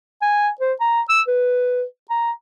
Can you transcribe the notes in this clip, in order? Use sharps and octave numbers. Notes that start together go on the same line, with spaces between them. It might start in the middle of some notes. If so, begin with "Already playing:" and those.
G#5
C5
A#5
E6
B4
A#5